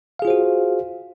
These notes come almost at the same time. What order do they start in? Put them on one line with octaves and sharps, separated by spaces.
F5 G#4 F4 C5 F#4